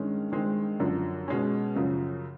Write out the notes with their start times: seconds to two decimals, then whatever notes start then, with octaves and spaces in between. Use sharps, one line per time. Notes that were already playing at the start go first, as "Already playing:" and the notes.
Already playing: G2 D#3 G#3 C#4
0.32 G2 D#3 G#3 C4
0.79 F#2 D3 F3
1.28 B2 G#3 C#4
1.75 F#2 C#3 F3